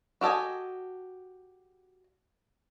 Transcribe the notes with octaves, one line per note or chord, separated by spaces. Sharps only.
F#4 G4 A4 D#5 G#5